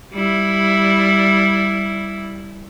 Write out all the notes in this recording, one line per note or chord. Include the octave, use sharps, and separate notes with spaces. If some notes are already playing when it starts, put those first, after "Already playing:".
G3 E4